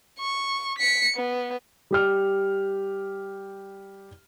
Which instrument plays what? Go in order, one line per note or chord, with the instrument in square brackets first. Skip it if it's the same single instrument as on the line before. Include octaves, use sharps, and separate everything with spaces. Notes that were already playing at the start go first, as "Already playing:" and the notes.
[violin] C#6
B6 C#7
B3
[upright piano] G3 G4 F6